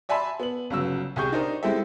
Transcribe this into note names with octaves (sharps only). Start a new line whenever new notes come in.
D5 E5 G#5 A5 B5 C6
B3 F#7
G1 C#3 F#3 E6 E7
C2 G4 G#4 C#6 G6
D4 D#4 A#4 C5 D#5
G#3 C4 E4 G4 A4 E5